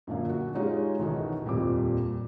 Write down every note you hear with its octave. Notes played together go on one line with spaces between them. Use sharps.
F#2 A#2 D3 A#3
F#4
G#3 C#4 D#4 F4 G4 G#4
B1 E2 D#3 F#4 A4 D#5
D#1 F2 A#2 G3 D6